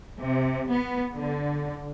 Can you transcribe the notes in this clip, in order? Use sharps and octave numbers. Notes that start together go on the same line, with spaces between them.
C3
B3
D3